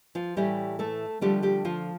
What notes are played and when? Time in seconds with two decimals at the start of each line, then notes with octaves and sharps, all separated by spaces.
0.15 F3 F4
0.36 A2 E3 G3 A3 G4
0.79 A3 A4
1.21 D3 F3 G3 A3 G4
1.42 G3 G4
1.65 F3 F4